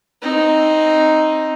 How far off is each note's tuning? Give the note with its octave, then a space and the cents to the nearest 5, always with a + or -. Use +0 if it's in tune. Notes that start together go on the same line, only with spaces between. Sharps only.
C4 +15 D#4 +0